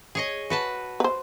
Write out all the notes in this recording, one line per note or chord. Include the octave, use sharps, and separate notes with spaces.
G#4 C#5 D#5
F#4 B4 A5
B4 C5